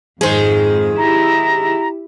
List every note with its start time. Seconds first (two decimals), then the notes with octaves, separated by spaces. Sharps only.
0.21 F2 G#2 D#3 G#3 G#4 C5
0.98 E4 G4 E5 A#5